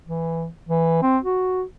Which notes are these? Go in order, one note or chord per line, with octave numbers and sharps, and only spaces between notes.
E3
E3
C4
F#4